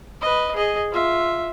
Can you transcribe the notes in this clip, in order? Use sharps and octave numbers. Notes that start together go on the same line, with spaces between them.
B4 D#5
G#4 D#5
F4 E5